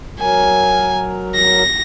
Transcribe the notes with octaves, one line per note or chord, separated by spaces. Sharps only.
F#3 A#4 G#5
A#6